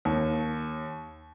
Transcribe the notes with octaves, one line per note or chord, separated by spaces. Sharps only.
D#2